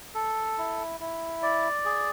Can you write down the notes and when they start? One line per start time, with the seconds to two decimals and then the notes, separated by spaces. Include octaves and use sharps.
0.15 A4
0.58 E4
1.00 E4
1.42 D5
1.85 G#4